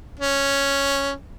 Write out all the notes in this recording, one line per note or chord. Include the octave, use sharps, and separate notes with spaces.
C#4